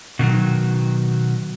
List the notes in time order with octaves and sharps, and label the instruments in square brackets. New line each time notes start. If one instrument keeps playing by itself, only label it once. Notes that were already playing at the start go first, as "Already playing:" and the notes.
[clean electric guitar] B2 D3 D#3 F#3